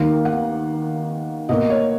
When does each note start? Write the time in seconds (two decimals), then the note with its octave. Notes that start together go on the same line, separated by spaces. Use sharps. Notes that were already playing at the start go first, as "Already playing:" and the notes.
Already playing: D#2 D#3 A#3 F5
0.25 F#5
1.49 B2 A#3 D#5
1.70 C#5